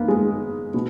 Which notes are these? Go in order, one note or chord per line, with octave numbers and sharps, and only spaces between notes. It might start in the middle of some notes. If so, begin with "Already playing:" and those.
Already playing: A#3 B3
G#3
B2